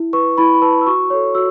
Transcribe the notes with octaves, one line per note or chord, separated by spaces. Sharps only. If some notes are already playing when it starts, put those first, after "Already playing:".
Already playing: E4
B4 C#6
E4 B5
B5
B4 A5
E6
F#4 C#6
A4 C#5
F#4 E6